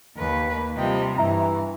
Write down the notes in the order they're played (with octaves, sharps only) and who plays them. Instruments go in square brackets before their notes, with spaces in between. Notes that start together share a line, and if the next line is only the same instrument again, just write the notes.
[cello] D#2 B4 [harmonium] A#3
[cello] C3 G3 [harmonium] F3 D#5 G5
[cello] G2 [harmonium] E3 E4 [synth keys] E5 A#5